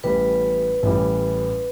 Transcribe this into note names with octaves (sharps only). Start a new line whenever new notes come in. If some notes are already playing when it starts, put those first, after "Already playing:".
A1 A2 E3 G3 B4
A1 A2 E3 G3